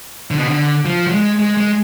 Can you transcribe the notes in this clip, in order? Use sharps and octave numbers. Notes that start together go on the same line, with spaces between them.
D3
B2
D3
F3
F#3
G#3
G#3
G#3